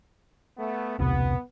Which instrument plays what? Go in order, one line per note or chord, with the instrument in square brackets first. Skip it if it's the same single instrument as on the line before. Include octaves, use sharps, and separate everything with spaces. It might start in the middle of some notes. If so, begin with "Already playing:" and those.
[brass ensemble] A3 B3
[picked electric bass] E1 C2 C3 [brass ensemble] B3